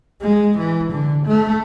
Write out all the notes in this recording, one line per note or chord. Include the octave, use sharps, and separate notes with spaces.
G#3
E3
D3
A3